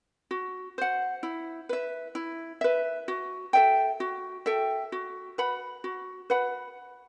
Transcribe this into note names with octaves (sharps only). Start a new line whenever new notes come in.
F#4
C5 F#5
E4
B4 E5
E4
B4 E5
F#4
A4 E5 G5
F#4
A4 E5 G5
F#4
B4 F#5 B5
F#4
B4 F#5 B5